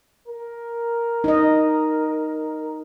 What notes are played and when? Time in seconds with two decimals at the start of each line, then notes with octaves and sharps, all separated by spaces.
0.27 A#4
1.24 D#4 D#5